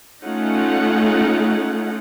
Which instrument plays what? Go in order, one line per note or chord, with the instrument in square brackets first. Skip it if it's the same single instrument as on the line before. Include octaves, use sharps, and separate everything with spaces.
[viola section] A3 C#4 D#4 F4 F#5